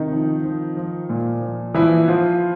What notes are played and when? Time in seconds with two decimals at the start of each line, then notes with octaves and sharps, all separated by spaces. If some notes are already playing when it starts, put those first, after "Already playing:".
Already playing: C3 D#3 D#4
0.11 F3
0.44 F3
0.77 F3
1.09 A#2
1.41 F3
1.74 E3 F3 E4
2.08 F3 F4